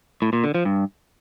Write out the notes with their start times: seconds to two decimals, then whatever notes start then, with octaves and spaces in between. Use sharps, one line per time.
0.22 A2
0.33 A#2
0.44 D3
0.55 F3
0.65 G2